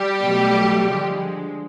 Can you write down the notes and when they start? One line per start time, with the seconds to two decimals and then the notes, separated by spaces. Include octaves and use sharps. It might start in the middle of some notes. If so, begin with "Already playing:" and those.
Already playing: G3 G4
0.22 B2 F#3 A3
0.87 D3 F3 G#3